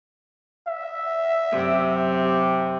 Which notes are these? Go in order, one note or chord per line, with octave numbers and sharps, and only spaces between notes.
E5
F#2 C3
G4